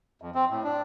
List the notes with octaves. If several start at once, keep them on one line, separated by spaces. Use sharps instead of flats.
F2
C4
A2
D4